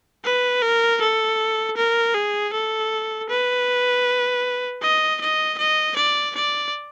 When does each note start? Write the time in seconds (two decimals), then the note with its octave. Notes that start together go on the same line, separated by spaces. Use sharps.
0.25 B4
0.62 A#4
1.01 A4
1.77 A#4
2.15 G#4
2.53 A4
3.29 B4
4.82 D#5
5.21 D#5
5.58 D#5
5.96 D5
6.36 D5